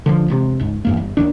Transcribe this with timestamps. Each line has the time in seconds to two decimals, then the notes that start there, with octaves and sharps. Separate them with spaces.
0.06 D3 E3 F3
0.28 E1 D2 C3
0.60 C#2 G#2
0.85 E2 G2 A#3
0.97 G1
1.17 D#2 D#3 D4